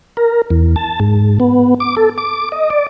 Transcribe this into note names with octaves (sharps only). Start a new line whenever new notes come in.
A#4
E2
A5
G#2
B3
D6
A4
D6
D#5
D5